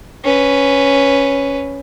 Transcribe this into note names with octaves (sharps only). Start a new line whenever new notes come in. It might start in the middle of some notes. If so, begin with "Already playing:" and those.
C#4 B4